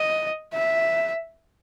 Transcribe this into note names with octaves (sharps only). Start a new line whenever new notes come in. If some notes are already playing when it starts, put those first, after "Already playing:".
Already playing: D#5
E5